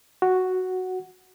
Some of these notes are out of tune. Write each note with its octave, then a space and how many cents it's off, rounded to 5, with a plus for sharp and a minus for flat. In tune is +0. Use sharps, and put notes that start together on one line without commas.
F#4 +0 F#5 +0